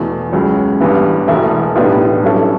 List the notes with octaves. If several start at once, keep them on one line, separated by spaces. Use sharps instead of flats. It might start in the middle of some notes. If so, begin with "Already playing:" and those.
Already playing: E2 B2 A3
C#2 C#3 F#3
A1 G2 E3 B3
E1 E2 B2 A3 E4
B1 A2 G3 B3 D4
G2 F#3 C#4 E4 A4